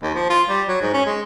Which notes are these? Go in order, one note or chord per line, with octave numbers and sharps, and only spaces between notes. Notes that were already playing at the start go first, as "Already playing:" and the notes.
D#2
F3
F4
G3
F#3
G#2
C#4
G#3